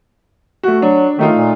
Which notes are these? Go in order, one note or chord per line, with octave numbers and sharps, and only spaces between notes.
A3 F#4
F#3 D4
D#3 A3 D#4 F4
A#2